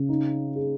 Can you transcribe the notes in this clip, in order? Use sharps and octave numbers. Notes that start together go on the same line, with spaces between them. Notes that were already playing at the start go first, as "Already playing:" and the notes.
Already playing: C#3
D#4
G#4